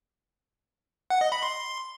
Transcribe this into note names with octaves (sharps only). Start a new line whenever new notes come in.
F#5
D#5
B5
C6